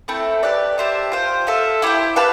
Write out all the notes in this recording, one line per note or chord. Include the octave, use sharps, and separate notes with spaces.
A3 C4 E4 A4
G4 B4 D5
G4 C5 E5 A5
F4 C5 G5
F4 A4 E5
E4 G4 C5 G5
G4 B4 F5 A5